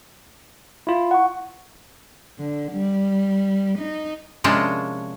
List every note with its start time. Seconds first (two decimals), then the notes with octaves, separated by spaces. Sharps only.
0.87 E4 F4
1.11 F#5 C#6
2.39 D3
2.72 G3
3.78 D#4
4.44 C3 F3 G#3 A#3 C#4 D4